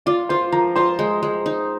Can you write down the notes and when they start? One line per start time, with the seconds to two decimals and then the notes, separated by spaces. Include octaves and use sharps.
0.06 F4 D5 D6
0.29 F4 C5 C6
0.52 F3 A#4 A#5
0.76 F4 C5 C6
0.99 G#3
1.23 G#3
1.46 D#4